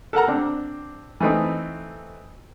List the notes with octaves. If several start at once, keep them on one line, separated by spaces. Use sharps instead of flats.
A4 A#4 F#5 A#5
C4 D4
E3 A3 C4 D#4